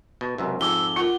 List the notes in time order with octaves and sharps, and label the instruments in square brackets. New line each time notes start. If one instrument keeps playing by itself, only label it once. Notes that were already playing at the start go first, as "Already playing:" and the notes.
[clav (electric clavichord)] B2
C#2 F#2 C3
[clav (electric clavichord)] F2 G#2 [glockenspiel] D6 G7 [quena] E6
[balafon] F4 A#4 [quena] F#5